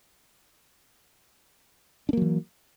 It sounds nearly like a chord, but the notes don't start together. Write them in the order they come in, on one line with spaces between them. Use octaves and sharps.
D4 A#3 F#3 E3